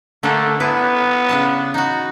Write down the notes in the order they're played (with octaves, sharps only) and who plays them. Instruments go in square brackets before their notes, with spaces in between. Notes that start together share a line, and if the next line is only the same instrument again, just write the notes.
[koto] D3 A#3 D4 [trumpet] A3
[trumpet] B3 [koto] E4 B4
[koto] C#3 D4 A5
D#4 F#4